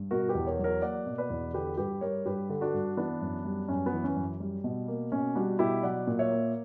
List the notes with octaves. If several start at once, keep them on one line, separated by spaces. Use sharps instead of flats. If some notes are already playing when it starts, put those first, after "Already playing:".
Already playing: G2
B2 F#4 A#4
G4 B4
E2
A#4 C#5
F#3
A#4 C#5
A#3 D5 F#5
B2
B4 D5
E2
D3 G4 B4
G2 G4 B4
G3 A#4 C#5
G2 G4 B4
D3
D4 F#4
G2
E3 B3 D4
F#2
G3
F#2 C#4
B3
E3
C#4
F#2
G3
B2
A#3
B2 C#4
G3 D4 F#4
B2 E4 G4
F#3 D5 F#5
A#2
C#5 E5
A#3